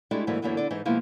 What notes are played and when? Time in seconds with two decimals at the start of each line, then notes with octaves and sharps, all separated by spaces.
0.11 G#3 A3 D4 E4 F#4 G4
0.27 G#2 D3 E3 F#3 A#3
0.42 F#2 D3 E3 F#3 A#3 B3
0.57 D3 B3 D5
0.70 G#2 E3 D#4 D#5 E5
0.85 B2 F3 G#3 A#3 B3 E4